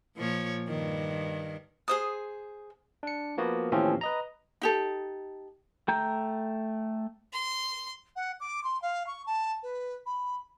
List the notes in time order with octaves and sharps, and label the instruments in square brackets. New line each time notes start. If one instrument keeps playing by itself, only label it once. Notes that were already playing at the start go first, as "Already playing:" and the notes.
[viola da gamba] A#2 F3 C#5
G2 D#3
[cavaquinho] G#4 C5 D#6
[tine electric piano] D4 C#7
F3 A#3 B3 F#4
D#2 A2 E3 F3 C4 C#4
B4 D#5 A#5
[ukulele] D#4 G4 A4
[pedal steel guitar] A3 G5 A#5 G6
[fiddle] C6
[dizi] F#5
D6
C6
F5
C#6
A5
B4
B5